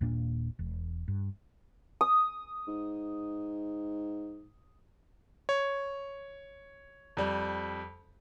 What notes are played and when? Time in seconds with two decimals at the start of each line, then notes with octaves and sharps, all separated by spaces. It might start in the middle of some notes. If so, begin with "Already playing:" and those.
0.01 D#1 A#2 A#3 D4
0.59 E1
1.08 G2
2.01 D#6
2.67 G#2
5.49 C#5
7.17 F2 G3